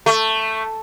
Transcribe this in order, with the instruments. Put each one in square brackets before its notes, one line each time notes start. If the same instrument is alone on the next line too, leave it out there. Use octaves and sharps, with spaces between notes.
[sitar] A3